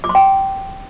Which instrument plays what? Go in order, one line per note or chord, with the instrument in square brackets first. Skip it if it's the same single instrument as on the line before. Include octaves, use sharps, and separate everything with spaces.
[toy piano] D6
C6
G5